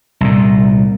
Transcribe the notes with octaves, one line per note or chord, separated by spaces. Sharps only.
C2 A#2